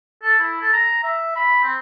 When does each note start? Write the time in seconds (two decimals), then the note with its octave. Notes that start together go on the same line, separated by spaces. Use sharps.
0.23 A4
0.39 E4
0.61 A4
0.73 A#5
1.03 E5
1.36 B5
1.63 C4